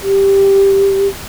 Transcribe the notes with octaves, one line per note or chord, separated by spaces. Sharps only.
G4